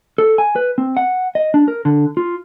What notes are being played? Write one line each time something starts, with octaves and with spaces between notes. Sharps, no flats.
A4
G#5
B4
C4
F#5
D#5
D4
A#4
D3
F4